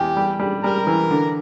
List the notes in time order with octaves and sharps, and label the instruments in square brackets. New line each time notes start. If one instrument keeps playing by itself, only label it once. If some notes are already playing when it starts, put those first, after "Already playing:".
Already playing: [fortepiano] E2 [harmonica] G4 G5
[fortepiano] G3
G3
[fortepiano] G3 [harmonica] A#4 A#5
[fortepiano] E3
D3